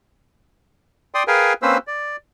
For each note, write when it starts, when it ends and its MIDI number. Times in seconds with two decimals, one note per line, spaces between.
1.14 1.23 74
1.14 1.23 79
1.14 1.23 84
1.14 1.23 87
1.28 1.53 68
1.28 1.53 70
1.28 1.53 71
1.28 1.53 77
1.28 1.53 79
1.28 1.53 80
1.62 1.77 58
1.62 1.77 60
1.62 1.77 61
1.62 1.77 71
1.62 1.77 72
1.62 1.77 88
1.87 2.16 74